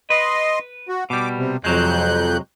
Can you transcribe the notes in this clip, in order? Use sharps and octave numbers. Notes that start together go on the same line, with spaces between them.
B4 D#5 C6
F#4
B2 G3 D6
C3
F2 C3 F#3 G#3 F#6 G6